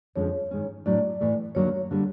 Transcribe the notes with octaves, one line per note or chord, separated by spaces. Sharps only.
F2 D3 F3 G#3 C#4 C#5
G#2 D#3 G#3 C#4
A2 F#3 A3 D4 D5
A2 E3 A3
D#2 D3 F#3 A#3 C#5
D3 G3 A#3